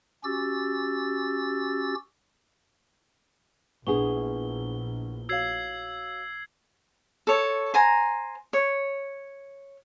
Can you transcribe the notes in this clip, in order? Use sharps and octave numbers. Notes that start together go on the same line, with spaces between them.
C#4 F#4 G4 E6 A6
A#1 B3 D4 E4 G#4 F#5 C#6 G7
F#4 C#5 F5 E6 G#6 C7
A4 C#5
C5 G#5 A#5
C#5